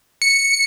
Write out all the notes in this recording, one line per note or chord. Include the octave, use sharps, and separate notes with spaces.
C#7